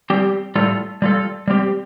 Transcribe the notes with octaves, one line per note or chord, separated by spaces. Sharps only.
G3 C4 G4
A2 G3 F4 A4
G3 F4 A4
G3 C4 G4